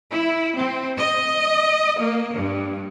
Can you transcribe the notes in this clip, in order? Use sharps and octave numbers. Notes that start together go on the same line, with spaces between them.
E4
C4
D#5
A#3
G2